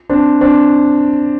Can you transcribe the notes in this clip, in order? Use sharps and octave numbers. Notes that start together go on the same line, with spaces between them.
C4 D4
C4 D4